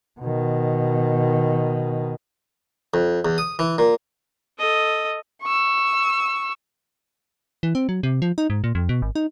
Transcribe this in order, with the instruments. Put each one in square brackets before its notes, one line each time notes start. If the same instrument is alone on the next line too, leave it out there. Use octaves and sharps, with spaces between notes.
[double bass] B2 D#3
[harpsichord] F2
E2
D#6
E3
A#2
[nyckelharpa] A4 D#5
[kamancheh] C#6 E6
[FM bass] E3
C4
F#3
C3
F3
D#4
G#2
A#2
F2
B2
G#1
D#4